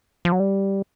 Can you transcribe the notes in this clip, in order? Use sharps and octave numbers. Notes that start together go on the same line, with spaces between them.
F3
F#3
G3